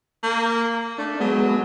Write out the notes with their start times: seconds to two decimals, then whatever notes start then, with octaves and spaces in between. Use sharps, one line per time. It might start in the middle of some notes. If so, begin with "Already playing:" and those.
0.23 A#3
0.98 A3 D4
1.20 F#3 G#3 B3